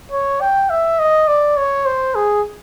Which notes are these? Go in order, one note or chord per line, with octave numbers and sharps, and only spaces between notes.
C#5
G5
E5
D#5
D5
C#5
C5
G#4